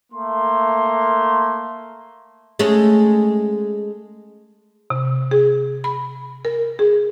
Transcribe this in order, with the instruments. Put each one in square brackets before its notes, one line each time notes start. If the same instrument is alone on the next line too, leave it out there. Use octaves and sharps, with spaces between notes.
[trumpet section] A3 A#3 C6
[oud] G#3 A3 C#4
[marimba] C3
G#4
B5
A#4
G#4